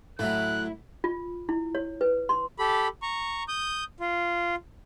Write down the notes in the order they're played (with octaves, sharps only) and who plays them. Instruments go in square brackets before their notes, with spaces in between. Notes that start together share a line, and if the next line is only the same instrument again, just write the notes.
[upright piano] A2 E5 [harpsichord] F#3 A3 [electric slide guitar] E4 [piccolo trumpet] F#6
[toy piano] F4
E4
C#5
B4
C6
[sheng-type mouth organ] G4 A4 B5
A#5 C#6
D#6 G6
F4